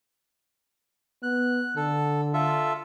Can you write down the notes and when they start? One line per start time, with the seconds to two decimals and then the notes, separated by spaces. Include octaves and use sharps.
1.23 B3 F#6
1.77 D3 A4
2.34 F4 A4 E5